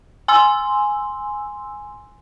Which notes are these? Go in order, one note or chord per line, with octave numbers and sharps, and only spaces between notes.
G#5 C6 E6